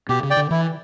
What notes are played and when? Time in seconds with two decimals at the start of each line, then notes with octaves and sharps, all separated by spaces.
0.09 B2 G4
0.23 C#3
0.30 D5 G5
0.37 D3
0.51 E3 E4